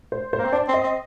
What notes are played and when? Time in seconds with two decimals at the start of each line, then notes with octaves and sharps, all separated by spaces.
0.12 C5
0.33 C5
0.38 A#3
0.45 C4
0.53 D4 D5
0.68 C4
0.74 D#5
0.84 C4